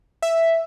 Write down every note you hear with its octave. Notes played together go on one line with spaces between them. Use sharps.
E5